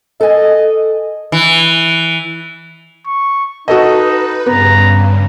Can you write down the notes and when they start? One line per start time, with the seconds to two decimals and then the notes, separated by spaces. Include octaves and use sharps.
0.21 A4 D#5 G#5
1.32 E3
3.07 C#6
3.68 D#4 F#4 A4 B4 D#5
4.46 G2 C#3 B3 A#5